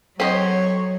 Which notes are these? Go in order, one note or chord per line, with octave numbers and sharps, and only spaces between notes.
F#3 C4 A4 C5 C#5 D#5 F#5 C7